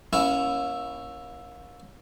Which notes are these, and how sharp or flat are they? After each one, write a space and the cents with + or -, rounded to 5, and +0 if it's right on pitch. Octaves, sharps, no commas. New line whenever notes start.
A#3 +35 C#4 +0 E4 +0